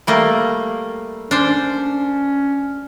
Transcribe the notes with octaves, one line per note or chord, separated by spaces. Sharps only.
G3 A3 A#3
C#4 D4 C5